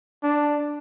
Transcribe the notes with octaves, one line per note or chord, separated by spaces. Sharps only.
D4